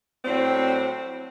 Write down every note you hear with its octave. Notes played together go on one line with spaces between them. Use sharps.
A2 F#3 G3 C4